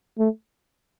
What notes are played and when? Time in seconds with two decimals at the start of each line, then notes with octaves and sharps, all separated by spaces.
0.18 A3